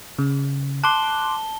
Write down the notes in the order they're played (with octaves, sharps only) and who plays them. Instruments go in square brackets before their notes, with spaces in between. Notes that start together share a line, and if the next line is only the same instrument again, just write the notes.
[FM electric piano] C#3
[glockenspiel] A5 G7 [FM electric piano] C6 D6 F#6